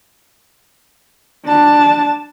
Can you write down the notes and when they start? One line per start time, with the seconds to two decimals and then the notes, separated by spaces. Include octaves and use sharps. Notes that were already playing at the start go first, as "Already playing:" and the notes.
1.45 D4 A5